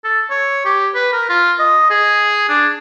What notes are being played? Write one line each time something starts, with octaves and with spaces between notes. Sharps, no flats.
A4
C#5
G4
B4
A#4
F4
D#5
G#4
D4